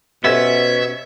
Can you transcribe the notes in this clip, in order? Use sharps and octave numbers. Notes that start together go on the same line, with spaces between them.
B2 B3 C#4 G4 A4 C5 E5